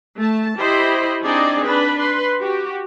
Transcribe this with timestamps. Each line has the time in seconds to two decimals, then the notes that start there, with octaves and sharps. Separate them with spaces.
0.18 A3 A5
0.57 E4 G4 C5 D#5 B5
1.24 C4 D4 D#4 G#4 D5 D#5
1.66 D4 B4 B5
2.00 B4 C6
2.40 F#4 G4